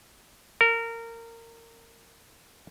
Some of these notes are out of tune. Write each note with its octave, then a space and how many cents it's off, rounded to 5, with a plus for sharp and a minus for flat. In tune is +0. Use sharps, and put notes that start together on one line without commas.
A#4 -20